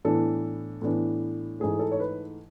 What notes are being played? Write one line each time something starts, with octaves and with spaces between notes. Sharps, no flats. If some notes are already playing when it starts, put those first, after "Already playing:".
A2 E3 B3 D4 A4
A2 E3 B3 D4
G#2 E3 A3 G#4
A4
C#5
B4